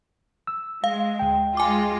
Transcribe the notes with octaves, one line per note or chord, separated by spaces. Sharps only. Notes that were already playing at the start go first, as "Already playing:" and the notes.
E6
G#3 F5
D2 G5
G#3 F4 G#5 D6